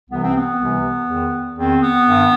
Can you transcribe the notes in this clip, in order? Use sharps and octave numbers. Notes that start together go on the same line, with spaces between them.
C2 C3 E3 B3
C4
B3
C2 C3 E3
E2 D#3
E2 D#3 C4
B3
G2 D#3